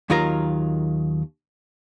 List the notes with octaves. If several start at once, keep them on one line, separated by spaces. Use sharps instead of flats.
D#2 D#3 F#3 F4 A#4 A#5